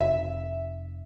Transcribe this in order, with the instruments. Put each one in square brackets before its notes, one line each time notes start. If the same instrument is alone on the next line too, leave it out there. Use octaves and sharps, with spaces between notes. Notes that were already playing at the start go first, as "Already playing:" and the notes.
[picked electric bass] F1 [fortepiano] E5